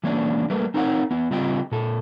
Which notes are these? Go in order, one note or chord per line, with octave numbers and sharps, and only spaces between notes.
E3 G#3 A#3 C#4 D4
G3 A3 A#3 A#4 B4
C4 D#4 A#4 C#5 F5 F#5
B3 E4
C#3 G3 C4 F4 D#5 G5
A#2 A4